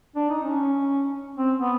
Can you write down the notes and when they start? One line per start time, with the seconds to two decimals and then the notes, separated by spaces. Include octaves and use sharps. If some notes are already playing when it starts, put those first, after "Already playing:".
0.16 D4
0.30 D#4
0.43 C#4
1.37 C4
1.57 B3